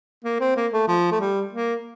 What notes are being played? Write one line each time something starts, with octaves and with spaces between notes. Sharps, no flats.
A#3
C4
A#3
A3
F3
A3
G3
A#3